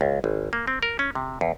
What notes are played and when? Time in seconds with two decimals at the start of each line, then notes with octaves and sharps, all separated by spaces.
0.01 C#2
0.24 G#1
0.53 A#3
0.67 C4
0.83 A#4
0.99 C#4
1.15 C3
1.41 E2